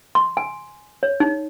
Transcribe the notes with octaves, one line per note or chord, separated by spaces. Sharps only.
C6
G#5
C#5
D#4